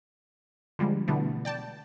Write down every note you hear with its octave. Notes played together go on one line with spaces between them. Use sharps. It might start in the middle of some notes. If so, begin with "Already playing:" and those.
D3 F3 G3 G#3
B2 D3 E3 G3 A3 B3
D5 G5 A5